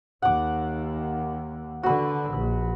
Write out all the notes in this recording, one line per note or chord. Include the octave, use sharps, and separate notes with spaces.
D#2 F#5 D6
D3 F#4 B4
A#1